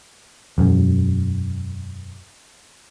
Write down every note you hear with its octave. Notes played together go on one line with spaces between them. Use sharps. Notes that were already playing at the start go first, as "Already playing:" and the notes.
E1 F#2